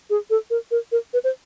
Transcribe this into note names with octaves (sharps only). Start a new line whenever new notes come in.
G#4
A4
A#4
A#4
A#4
B4
C5